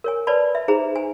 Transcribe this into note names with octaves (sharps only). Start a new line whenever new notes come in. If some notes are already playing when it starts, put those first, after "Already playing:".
A#4 C#5 G#5
B4 C#5 D5 A5 B5
E5
D#4 G#4 C5 A#5
G#5